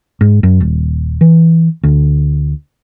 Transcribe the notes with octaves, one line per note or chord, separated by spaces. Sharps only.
G#2
F#2
D#1
E3
D2